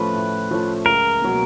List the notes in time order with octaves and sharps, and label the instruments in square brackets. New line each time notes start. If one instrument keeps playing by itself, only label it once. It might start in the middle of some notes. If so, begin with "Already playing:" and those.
Already playing: [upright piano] A2 F3 A3 C#4 F4 [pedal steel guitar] B4
[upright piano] A2
F3 A3 C#4 F4
[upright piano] C#2 [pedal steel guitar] A#4
[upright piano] B2 F#3 A#3